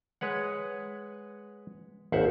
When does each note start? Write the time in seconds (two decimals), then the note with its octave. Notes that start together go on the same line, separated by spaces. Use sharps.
0.21 G#3 B4 C#5 F#5
2.12 G#1 D#2 C5 E5 F#5